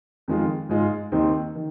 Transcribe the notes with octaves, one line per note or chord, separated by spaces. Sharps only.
F2 D#3 G#3 F4
G#2 G#3 F4
D#2 D#3 C4 D#4
D#3